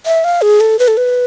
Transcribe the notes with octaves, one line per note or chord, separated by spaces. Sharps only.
E5
F5
G#4
A4
B4
A4
B4